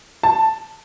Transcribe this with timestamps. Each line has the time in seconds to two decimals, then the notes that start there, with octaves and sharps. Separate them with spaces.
0.23 A5